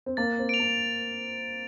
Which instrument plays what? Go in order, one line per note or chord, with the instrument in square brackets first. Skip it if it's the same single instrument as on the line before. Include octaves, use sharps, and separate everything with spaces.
[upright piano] C4
[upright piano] A#3 [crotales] A6
[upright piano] C4
[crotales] D7 F7
[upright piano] A#3